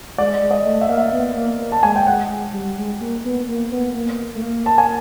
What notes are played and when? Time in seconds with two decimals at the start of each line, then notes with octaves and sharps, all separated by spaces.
0.18 G#3 D5
0.42 G#3
0.51 D#5
0.66 A3
0.81 E5
0.89 A#3 F5
0.97 E5
1.13 B3
1.36 A#3
1.60 A#3
1.72 A5
1.83 G#3 G#5
1.96 G5
2.06 G#3 F#5
2.30 G#3
2.53 G3
2.78 G#3
3.01 A#3
3.25 B3
3.49 A#3
3.72 B3
3.95 A#3
4.35 A3
4.42 A#3
4.66 A5
4.78 G#5